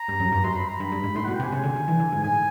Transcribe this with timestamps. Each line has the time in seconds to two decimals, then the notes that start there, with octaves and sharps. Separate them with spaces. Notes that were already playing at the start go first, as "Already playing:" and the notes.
Already playing: A#5
0.08 G2
0.20 F#2
0.32 G2
0.44 F#2 C6
0.56 B5
0.68 A#5
0.80 G2 B5
0.92 G2
1.04 G#2
1.16 A2 C6
1.24 B2 F#5
1.34 G5
1.40 C3 G#5
1.52 C#3
1.64 D3
1.76 D#3
1.88 E3
2.00 D3
2.12 G#2
2.23 A2 G#5